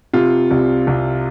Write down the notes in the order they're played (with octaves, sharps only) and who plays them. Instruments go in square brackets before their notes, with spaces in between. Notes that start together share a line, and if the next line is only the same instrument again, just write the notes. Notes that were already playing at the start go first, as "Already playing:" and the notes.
[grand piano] C3 F4
C2
C2